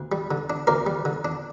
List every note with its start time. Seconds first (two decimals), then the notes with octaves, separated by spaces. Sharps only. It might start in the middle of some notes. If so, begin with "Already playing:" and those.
Already playing: D2
0.12 G3
0.31 D3
0.50 D4
0.67 D2 A#4 D5
0.86 G3
1.05 D3
1.25 D4